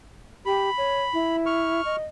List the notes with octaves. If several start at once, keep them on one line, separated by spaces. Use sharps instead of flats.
G4 B5
C#5
E4
C#6 F6
D#5